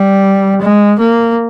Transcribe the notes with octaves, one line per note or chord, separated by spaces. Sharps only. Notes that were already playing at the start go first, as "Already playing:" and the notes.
Already playing: G3
G#3
A#3